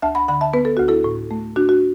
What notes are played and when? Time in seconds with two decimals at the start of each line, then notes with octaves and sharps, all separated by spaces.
0.02 D2 E5 A5
0.15 F#5 B5
0.28 D3 F#5 B5
0.41 E5 A5
0.53 B3 B4
0.65 A4
0.77 D2 F#4
0.88 E4 A4
1.04 A2
1.31 A3
1.56 D4 F#4
1.69 F#4